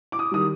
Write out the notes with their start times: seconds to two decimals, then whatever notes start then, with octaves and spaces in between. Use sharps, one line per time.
0.12 D6
0.19 D#6
0.31 D#3 G3 D#6